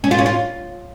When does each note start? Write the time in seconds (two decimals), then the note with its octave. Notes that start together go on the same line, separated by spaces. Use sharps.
0.04 C#4
0.11 F4
0.18 C#4
0.26 F4